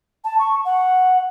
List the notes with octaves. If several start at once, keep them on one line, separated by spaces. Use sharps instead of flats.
A5
C#6
F#5